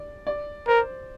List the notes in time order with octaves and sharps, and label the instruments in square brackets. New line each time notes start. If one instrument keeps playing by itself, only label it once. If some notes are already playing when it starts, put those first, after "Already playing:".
Already playing: [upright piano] D5
D5
[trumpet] A#4 [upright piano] C5